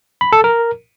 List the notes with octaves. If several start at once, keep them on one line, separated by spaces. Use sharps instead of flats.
B5
A4
A#4